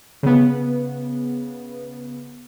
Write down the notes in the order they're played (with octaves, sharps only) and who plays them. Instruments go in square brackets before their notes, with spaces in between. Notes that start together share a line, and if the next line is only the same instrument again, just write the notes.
[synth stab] C#3 B3